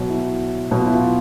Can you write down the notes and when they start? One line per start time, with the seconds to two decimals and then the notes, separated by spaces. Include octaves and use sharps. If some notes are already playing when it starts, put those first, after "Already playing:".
Already playing: B2 F#3
0.09 E4
0.71 B2 F#3 F#4
0.79 F4
0.86 E4
0.94 F4